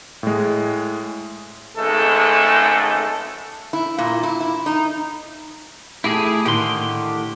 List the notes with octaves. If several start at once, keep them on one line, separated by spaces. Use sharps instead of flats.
A2 G#3
G#1 C#2 G#3 A3 A4
E4
A#2
E4
E4
D#4
A3 E4 G4 G#4
A2 D3 D#3 G4 C6